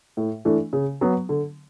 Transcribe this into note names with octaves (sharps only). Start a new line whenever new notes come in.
A2
E3 A3 D4
C#3
F#3 B3
D3